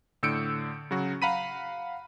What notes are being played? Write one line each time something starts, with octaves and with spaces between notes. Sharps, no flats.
A2 D3 E6 G6 C#7 D7
C#3 F#3 F#4
F5 F#5 A#5 B5 B6 D#7